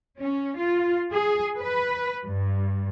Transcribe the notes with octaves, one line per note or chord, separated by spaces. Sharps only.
C#4
F4
G#4
B4
G2